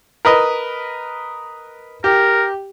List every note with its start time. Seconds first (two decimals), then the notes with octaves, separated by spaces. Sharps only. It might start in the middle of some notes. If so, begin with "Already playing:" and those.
0.25 A#4 B4 D#5
2.04 G4 A#4